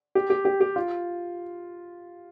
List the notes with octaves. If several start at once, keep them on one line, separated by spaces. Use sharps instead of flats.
G4
G4
G4
G4
F4